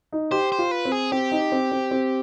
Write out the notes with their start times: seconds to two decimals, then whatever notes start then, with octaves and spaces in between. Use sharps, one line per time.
0.12 D#4
0.31 G4 C5
0.52 C5
0.59 F4
0.71 B4
0.85 C4
0.92 G#4
1.12 C4 G4
1.32 D#4
1.52 C4
1.72 C4
1.91 C4